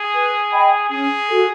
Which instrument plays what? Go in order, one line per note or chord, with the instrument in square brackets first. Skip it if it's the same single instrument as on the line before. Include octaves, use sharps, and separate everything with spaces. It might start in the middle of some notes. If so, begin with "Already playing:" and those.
Already playing: [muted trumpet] G#4
[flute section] B4
D#5 G5 B5
[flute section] C#4 [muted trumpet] G#4
[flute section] F#4 A4